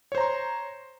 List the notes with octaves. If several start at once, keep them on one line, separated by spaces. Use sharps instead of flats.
C5 C#5 A#5 C6